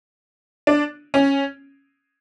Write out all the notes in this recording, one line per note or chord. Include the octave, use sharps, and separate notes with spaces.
D4
C#4